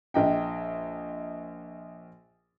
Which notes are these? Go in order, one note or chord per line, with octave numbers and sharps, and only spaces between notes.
A#1 D#5 G5